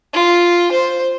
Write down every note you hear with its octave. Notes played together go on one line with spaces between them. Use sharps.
F4
C5